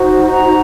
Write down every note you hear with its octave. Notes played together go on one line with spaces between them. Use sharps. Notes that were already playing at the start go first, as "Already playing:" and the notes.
Already playing: D#4 F#4 C5
A#5